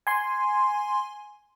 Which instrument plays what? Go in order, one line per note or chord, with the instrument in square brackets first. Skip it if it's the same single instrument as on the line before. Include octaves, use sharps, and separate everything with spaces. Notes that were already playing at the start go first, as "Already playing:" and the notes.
[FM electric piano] G#5 C6